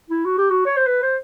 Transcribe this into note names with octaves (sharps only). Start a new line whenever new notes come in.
E4
F#4
G4
F#4
C#5
C5
B4
C5